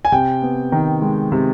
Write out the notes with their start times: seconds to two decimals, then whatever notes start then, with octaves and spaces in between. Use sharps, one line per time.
0.05 G#5
0.12 C3 G5
0.42 B3
0.72 D#3
1.02 G#3
1.32 C3